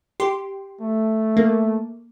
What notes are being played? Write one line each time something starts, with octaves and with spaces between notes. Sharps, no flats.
G4 C6
A3
A#3